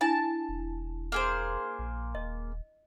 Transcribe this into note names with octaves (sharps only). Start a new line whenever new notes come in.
D4 E4 G#5 A5
E1
A#3 G#4 C5
A#1
D#1 D#5